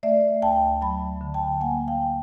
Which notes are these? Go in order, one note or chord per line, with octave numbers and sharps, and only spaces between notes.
A3 D5 E5
D2 G5 A5
F#3 A5 B5
D3
G5 A5
A#3 F#5 G#5
F5 G5